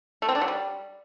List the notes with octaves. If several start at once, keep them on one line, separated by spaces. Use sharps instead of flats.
A3
C4
D4
F#3
G3